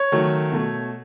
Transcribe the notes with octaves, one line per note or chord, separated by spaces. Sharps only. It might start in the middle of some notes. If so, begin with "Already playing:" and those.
Already playing: C#5
D#3 F#3 A3
B2 A3